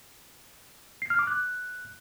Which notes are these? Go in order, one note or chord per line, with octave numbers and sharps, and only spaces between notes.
C7
F6
D6
F#6